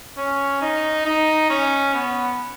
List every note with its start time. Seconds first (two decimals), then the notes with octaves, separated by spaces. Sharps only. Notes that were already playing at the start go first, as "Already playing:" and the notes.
0.18 C#4
0.62 D#4
1.05 D#4
1.50 C#4
1.94 B3